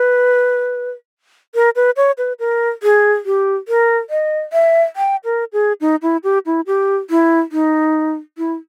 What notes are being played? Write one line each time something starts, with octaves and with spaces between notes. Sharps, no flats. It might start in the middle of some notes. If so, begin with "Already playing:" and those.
Already playing: B4
A#4
B4
C#5
B4
A#4
G#4
G4
A#4
D#5
E5
G5
A#4
G#4
D#4
E4
G4
E4
G4
E4
D#4
E4